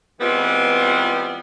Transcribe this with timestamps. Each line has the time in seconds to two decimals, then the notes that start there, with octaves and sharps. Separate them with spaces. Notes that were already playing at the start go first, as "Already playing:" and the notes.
0.20 E3 G3 G#3 B3 C4 F4